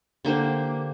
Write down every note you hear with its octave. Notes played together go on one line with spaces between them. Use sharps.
D3 A#3 G4 C5